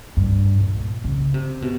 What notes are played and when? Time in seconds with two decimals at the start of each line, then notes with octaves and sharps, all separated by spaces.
0.17 G2
0.60 A#2
1.04 C#3
1.34 C3
1.62 B2